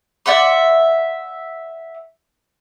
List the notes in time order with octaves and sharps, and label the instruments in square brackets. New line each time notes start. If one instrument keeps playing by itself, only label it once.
[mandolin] D5 E5 F#5 C6